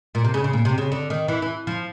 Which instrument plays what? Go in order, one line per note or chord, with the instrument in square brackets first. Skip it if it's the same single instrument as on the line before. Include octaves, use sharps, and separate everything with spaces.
[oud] A#2
C3
C#3
C#3
A#2
C3
C#3
D3
D#3
E3
E3
F3